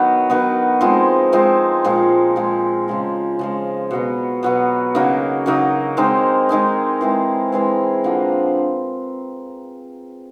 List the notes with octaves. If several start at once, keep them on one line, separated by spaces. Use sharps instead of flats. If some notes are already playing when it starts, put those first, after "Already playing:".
Already playing: D#3 F#3 B3
D#3 F#3 B3
F3 G#3 C4 D#4
F3 G#3 C4 D#4
A#2 F3 G#3
A#2 F3 G#3
C#3 F3 G#3
C#3 F3 G#3
B2 F#3 B3
B2 F#3 B3
C#3 F#3 A#3 D#4
C#3 F#3 A#3 D#4
D#3 G#3 C4 D#4
D#3 G#3 C4 D#4
E3 G#3 C4
E3 G#3 C4
D3 F3 A#3 D4